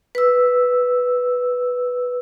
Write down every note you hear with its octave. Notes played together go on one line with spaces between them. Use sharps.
B4 E6